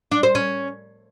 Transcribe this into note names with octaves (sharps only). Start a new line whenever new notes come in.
D4
C5
C#4